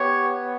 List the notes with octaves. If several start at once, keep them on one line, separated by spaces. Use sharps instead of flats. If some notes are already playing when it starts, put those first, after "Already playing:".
Already playing: B3 G4 C#5